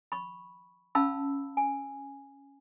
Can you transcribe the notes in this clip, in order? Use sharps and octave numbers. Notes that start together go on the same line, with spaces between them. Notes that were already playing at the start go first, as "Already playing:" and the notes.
B5 C#6
C#4 F5 A5 B5 E6
G#5